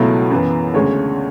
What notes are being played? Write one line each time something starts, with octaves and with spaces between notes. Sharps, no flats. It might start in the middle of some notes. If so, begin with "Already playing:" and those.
Already playing: C#2 B2 F#3 A3 E4
F#2 E3 B3
D2 C#3 G#3 C#5